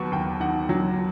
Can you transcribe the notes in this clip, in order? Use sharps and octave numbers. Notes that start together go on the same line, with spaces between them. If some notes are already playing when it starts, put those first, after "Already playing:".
Already playing: D#2 F#3 B3 C#6
D#2 G5
D#3 F#5
F#3